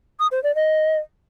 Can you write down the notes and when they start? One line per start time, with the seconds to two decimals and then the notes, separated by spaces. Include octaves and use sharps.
0.20 D#6
0.32 C5
0.43 D5
0.55 D#5